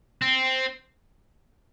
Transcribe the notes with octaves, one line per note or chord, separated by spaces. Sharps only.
C4